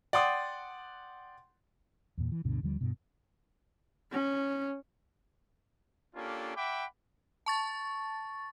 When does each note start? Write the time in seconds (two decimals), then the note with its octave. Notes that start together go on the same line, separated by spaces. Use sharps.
0.13 D5 F#5 G5 C6 D#6
2.18 E2 A#2
2.32 E3
2.44 D2 G2 B2 D3
2.63 D#2 D3 F3 G3
2.81 G2 B2
4.12 C#4
6.15 A#3 C#4 D4 F4 G4 A4
6.56 E5 F#5 G5 B5 D6
7.46 A5 C#6 A6